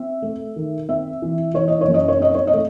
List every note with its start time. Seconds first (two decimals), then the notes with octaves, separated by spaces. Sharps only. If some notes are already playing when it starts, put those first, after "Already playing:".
Already playing: C4 E5
0.22 A3
0.56 D#3
0.89 C4 E5
1.22 E3
1.54 E3 C#5
1.68 D#5
1.81 C#5
1.88 F#2
1.94 D#5
2.08 C#5
2.20 C4 D#5
2.35 C#5
2.47 D#5
2.53 A3